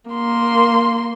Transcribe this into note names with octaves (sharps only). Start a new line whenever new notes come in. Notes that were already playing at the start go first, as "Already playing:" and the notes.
A#3 C6